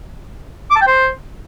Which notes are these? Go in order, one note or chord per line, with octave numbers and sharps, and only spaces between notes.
D6
A5
G5
C5